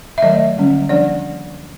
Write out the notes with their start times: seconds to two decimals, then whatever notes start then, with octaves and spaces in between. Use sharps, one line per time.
0.18 E5
0.22 D#3 F#3 A3 D#5
0.57 D3 G3 A#3 C#4
0.89 D3 F3 A#3 D4 D5